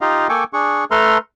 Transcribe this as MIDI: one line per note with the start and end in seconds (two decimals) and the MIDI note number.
0.01 0.28 63
0.01 0.28 65
0.01 0.28 67
0.01 0.28 75
0.01 0.28 77
0.29 0.44 58
0.29 0.44 69
0.29 0.44 79
0.29 0.44 80
0.29 0.44 85
0.29 0.44 86
0.53 0.84 62
0.53 0.84 68
0.53 0.84 85
0.91 1.18 57
0.91 1.18 69
0.91 1.18 71
0.91 1.18 82
0.91 1.18 84
0.91 1.18 89